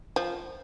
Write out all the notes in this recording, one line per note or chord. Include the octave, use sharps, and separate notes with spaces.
F3